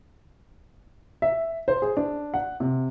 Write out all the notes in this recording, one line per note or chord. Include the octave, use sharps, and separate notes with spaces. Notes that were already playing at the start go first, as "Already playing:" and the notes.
E5
C5
G#4
D4
F#5
C3